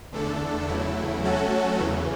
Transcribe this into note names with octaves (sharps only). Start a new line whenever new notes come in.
E2 D3 A3 D4 A4
E2 C#3 F#3 A3 E4
F#3 A3 C#4 F#4 A4
E2 C#3 E3